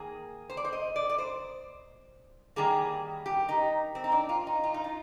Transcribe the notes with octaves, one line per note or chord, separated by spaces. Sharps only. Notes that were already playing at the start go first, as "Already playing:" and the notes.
Already playing: D#3 A#3 G#4
C5
D5
C5
D#5
D5
D5
C5
D#3 G3 A#3 G#4
G4
D#4
C4
D#4
D4
F4
D#4
F4
D#4
F4